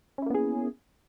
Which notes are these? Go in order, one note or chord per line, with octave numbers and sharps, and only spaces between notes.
A#3 B3 C#4 E4 G#4